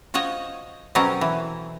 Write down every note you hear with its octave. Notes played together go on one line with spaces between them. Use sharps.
F4 F#4 C5 C#5 D#5
B2 F#3 C4 C#4 A4 A#4
E3